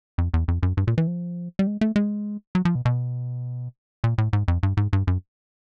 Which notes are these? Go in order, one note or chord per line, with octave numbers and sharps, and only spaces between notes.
F2
E2
F2
F#2
G2
A#2
E3
F3
G3
G#3
A3
G#3
F#3
F3
B2
B2
A#2
A2
G#2
F2
G2
G#2
G2
F#2